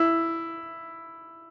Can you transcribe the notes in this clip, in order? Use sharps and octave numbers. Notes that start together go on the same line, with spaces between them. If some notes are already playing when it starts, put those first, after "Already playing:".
Already playing: E4